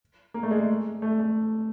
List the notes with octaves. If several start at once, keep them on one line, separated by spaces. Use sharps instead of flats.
A#3
A3
G#3
A3
A3
A3